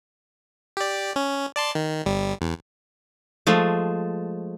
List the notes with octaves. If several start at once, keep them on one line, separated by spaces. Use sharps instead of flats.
G4 D5
C#4
D5 A5 C6
D#3
G1 G3
E2
F3 G#3 A3